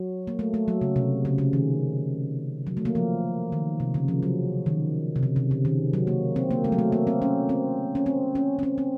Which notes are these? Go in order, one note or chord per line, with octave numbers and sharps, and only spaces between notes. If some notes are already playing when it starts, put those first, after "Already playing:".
Already playing: F#3
A#3
A3
A3
F#3
C#3
C3
C#3
C#3
D#3
F#3
A3
A#3
F3
D#3
C3
C#3
F3
F#3
D#3
C3
C#3
C3
C#3
D#3
F#3
A#3
C4
A#3
A3
F#3
A3
A#3
C4
C#4
C4
C#4
C4
C#4
C4
C#4
C4